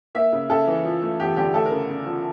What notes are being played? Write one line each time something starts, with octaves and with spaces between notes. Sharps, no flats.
A#3 E5
C#3
C#3 A4
E3
F3
A3
E2 G4
D3 G4
A3 A4
A#4
C#3
C#3
F3